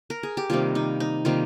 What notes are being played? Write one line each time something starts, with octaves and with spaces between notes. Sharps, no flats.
A#4
G#4
G4
C3 D#3 G3 A#3 F4
D#4
D#4
C3 D#3 G3 A#3 F4